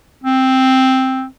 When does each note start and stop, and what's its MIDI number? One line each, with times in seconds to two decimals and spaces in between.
0.24 1.25 60